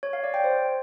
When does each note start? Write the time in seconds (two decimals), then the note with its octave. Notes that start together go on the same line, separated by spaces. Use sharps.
0.03 C#5
0.13 F5
0.24 D5
0.34 G5
0.44 C5